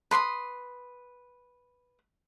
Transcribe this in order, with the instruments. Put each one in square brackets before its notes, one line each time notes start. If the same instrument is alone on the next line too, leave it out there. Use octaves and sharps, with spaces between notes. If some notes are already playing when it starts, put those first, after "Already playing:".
[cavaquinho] B4 C6 D6 D#6